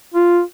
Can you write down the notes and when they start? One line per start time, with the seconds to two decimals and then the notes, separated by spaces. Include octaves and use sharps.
0.14 F4